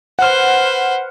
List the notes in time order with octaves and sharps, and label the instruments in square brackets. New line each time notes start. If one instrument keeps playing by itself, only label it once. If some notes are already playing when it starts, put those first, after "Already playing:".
[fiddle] B4 C5 [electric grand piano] F#5 F6